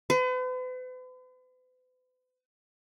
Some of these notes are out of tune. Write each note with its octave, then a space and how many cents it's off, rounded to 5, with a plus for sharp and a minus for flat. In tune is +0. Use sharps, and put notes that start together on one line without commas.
B4 +45